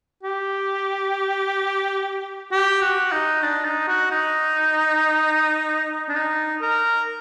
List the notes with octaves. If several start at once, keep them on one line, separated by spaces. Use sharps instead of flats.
G4
G4
F#4
D#4
D4
D#4
F#4
D#4
D4
D#4
A#4